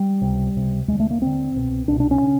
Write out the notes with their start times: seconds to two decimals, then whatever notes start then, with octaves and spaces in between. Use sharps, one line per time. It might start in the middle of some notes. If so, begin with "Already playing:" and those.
Already playing: G3
0.21 C#2 C3
0.55 C#2 C3
0.88 D#2 D3 G#3
1.00 A3
1.11 A#3
1.21 D#2 D3 C4
1.55 C2 B2
1.88 C2 B2 D4
2.00 D4
2.11 C#4
2.23 C#3